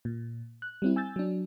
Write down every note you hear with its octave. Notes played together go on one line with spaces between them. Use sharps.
A#2
F#6
G3 C4 E4
G#5 E6 G6 A6
F#3 D4